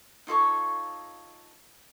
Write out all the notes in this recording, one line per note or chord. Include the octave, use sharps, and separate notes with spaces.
D#4 F4 A4 C#5